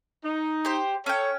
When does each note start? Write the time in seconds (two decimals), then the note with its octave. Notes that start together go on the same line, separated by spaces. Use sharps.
0.24 D#4
0.65 G4 C5
1.06 C#4 A4 C#5 G5